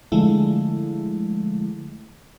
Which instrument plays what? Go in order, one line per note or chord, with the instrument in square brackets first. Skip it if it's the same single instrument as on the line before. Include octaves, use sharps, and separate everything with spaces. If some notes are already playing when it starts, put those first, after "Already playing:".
[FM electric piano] D3 F3 G#3 A3 E4